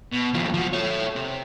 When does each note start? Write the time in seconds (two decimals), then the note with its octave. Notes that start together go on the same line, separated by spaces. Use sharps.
0.13 B2
0.34 D#2 F3
0.54 F3 F#4
0.73 A4 C#5
1.16 C3